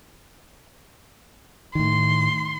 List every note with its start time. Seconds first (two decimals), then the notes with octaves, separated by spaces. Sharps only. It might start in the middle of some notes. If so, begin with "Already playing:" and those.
1.75 A2 D#3 C6